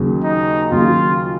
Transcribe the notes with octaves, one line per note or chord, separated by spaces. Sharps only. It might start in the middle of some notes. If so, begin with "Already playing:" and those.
Already playing: D#2 C#3 F#3
D#4
D#2 C#3 F#3 F4